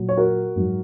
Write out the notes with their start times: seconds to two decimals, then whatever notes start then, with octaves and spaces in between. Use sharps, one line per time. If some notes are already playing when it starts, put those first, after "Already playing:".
Already playing: A#2 F#3
0.09 C#5
0.17 F#4 A#4
0.56 G#2 F#3